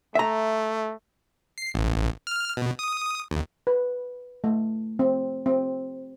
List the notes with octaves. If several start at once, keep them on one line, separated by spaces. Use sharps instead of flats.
A3 E5 A#5
C7
A1
F6
B2
D#6
D#2
B4
A3
C4
C4